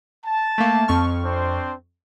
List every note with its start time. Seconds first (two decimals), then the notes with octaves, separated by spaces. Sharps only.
0.25 A5
0.58 A3 A#3
0.88 F2 C#6 F6
1.24 C4 D4 C5